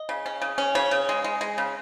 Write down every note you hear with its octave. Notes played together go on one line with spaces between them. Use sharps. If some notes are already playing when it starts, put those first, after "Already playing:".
Already playing: D#5
C#3
C#4
C#3
C#4
C#3 C#5
C#3
G#3
G#3
G#3
C#3